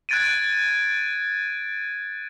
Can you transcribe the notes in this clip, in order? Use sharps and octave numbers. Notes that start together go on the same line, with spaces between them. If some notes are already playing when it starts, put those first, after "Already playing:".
F#6 G#6 A6 D7 D#7